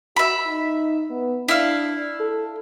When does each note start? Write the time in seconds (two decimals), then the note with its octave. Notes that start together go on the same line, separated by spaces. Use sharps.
0.16 F#4 E5 B5
0.46 D#4
1.10 B3
1.48 D4 E4 F5
2.20 A4